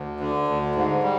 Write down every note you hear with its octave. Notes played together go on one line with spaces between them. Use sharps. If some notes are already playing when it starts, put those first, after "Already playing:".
Already playing: D2
D3
D2
G#2
G3